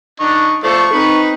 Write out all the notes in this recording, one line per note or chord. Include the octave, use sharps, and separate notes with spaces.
D4 D#4 C#6
F3 A3 A4 C5 D5 C#6
C4 D#4 B4 B5